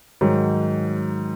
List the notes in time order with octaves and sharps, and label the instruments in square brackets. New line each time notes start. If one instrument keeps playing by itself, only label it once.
[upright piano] G#2 D#3 F#3